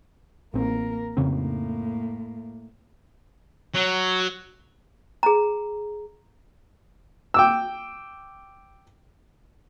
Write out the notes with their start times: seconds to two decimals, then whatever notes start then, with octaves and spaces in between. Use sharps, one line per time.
0.54 A1 A#3 C4 A#4
1.17 F2 A2 C#3 A#3 C4
3.74 F#3
5.23 G#4 A#5
7.34 G5 D6 E6